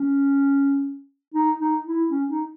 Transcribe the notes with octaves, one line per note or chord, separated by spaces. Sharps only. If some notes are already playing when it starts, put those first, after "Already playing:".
Already playing: C#4
D#4
D#4
E4
C#4
D#4